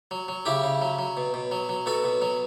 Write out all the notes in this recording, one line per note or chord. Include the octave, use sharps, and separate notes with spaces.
F#3
F#3
C#3 E4 G4
C#3
F#3
F#3
B2
B2
F#3
F#3
B2 F#4 A4
B2
F#3